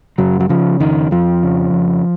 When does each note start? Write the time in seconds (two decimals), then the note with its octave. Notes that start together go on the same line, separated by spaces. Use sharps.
0.18 F#2 C#3 F#3
0.40 F#3
0.49 C#3 F3
0.80 F2 D#3
1.11 F2 F3
1.43 C#3
1.73 F2